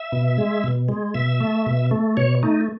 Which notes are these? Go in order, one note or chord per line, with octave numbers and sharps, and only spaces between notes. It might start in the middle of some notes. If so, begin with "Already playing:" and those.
Already playing: E5
B2
G#3
B2
G#3
B2 E5
A3
B2
A3
B2 C#5
A3 D#4